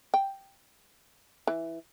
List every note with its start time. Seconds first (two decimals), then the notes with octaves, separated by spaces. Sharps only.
0.14 G5
1.47 E3